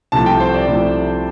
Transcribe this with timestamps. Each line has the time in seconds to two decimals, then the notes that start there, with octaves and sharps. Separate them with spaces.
0.12 C2 C3 F3 A3 A5
0.26 G5
0.40 C5
0.54 D5
0.68 C2 C3 F3 A3